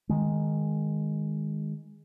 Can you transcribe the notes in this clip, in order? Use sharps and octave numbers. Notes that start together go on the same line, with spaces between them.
D#3 G#3